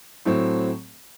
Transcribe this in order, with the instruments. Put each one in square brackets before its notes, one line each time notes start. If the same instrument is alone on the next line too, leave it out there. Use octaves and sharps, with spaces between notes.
[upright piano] A2 F#3 A3 C4